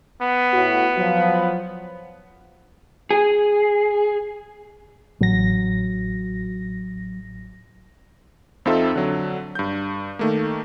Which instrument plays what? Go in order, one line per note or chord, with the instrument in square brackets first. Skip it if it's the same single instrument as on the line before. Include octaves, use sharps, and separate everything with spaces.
[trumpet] B3
[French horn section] A2 F#4
F3 F#3
[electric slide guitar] G#4
[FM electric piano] A1 A#6 [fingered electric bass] F#3
[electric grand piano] F2 C4 D#4 F4 A4 E5
D3 F#3
G2 G6
D#3 A3 A#3